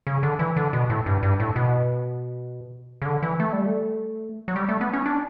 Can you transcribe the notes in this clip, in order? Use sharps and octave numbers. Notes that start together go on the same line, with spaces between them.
C#3
D3
E3
D3
B2
A2
G2
G2
A2
B2
C#3
D3
E3
A3
G3
A3
F#3
G3
A3
B3
C#4
D4